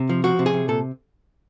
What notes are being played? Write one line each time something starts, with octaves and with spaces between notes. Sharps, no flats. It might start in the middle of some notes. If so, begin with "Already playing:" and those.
Already playing: C3
F3
F3 F#4
C3
G#4
C3
A#2 A4